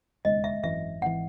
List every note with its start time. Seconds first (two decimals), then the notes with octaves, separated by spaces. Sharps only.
0.25 E1 D#2 C#3 G#3 D#5
0.44 E5
0.63 G#1 F#2 E3 E5
1.01 G#1 E3 F#5